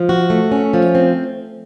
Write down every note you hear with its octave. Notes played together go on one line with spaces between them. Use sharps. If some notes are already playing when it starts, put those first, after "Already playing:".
Already playing: F3
F#4
A3
C#4
F3
C4